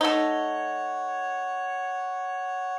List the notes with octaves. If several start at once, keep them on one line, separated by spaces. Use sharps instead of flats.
A3 D#4 C#5 F#5